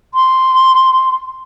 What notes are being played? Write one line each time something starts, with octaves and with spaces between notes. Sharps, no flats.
C6